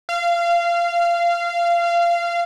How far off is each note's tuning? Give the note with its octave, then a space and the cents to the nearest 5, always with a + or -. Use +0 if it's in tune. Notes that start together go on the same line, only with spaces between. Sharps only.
F5 -25